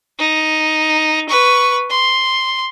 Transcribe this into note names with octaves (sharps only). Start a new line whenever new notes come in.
D#4
B4 C#6
C6